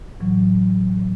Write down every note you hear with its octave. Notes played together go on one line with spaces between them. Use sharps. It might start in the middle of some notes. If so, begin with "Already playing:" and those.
A2 E3 F#3